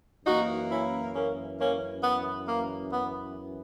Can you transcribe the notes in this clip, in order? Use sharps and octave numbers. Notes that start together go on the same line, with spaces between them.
F#2 E3 A#3 D#4 F#4
C#4 E4
A#3 C#4
A#3 C#4
B3
A#3
B3